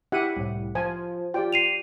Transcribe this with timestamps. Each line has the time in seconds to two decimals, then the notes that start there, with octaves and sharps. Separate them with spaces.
0.12 E4 G4 E5 F#5 D#7
0.37 C2 A2
0.75 F3 F4 G#5
1.34 F4 G4 D5 G5
1.53 C7 D#7 F7